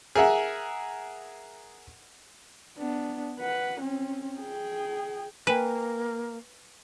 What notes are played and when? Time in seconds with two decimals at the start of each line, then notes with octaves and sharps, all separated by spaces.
0.15 G#4 A#4 E5 F#5
2.78 B3 D4
3.40 B4 F#5
3.81 C4 C#4
4.40 G#4 G5
5.47 A#3 B4 G5 G#5